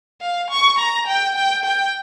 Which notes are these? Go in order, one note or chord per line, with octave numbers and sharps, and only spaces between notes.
F5
C#6
A#5
G5
G5
G5